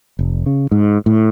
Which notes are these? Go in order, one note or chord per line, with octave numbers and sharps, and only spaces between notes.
F1
C#3
G#2
A2